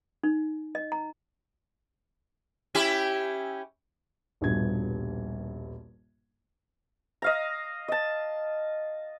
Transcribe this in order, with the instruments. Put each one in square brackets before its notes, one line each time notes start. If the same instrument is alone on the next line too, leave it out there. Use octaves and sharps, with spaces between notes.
[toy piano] D#4
D#5
A#5
[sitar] C#4 E4 G4
[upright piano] D#1 A#1 G2 B2 G#6
[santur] D#5 F5 A#5
D#5 A5